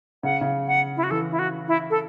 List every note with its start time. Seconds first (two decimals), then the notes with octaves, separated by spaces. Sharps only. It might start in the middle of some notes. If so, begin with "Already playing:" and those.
0.23 C#3 F#5
0.41 C#3
0.68 F#5
0.97 E4
1.03 F#4
1.11 E3 A4
1.31 E4
1.39 F#4
1.68 E4
1.90 A4